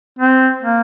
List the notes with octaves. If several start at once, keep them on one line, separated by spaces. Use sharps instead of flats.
C4
A#3